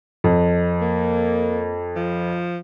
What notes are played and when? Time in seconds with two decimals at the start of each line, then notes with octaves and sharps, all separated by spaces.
0.24 F2
0.81 A#3
1.96 F3